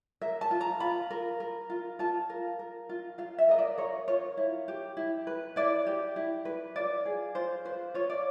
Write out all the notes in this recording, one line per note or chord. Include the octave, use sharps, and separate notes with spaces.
A#4 E5
A5
F4
A#5
F4 B5
A#4
A#4
F4
F4 A5
A#4
A#4
F4
F4 F5
E5
A#4 D#5
D5
A#4 C#5
F4 C#5
E4
G4
E4
B4
E4 D5
G4
E4
B4
F4 D5
G#4
F4 C5
B4 C5
F4 C#5
D5